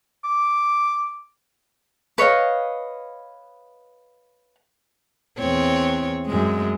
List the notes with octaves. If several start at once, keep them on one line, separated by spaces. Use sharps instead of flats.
D6
B4 C#5 D#5 F5
E2 C4 C#5
F#2 G#3